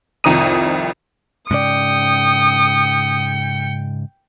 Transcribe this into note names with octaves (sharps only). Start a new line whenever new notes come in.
C2 F2 D#3 A#5 D#6 D#7
G#2 C#3 D5 G5 D#6 C#7